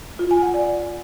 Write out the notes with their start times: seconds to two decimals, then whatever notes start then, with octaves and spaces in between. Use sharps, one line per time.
0.19 F4
0.31 G#5
0.42 F#5
0.54 D5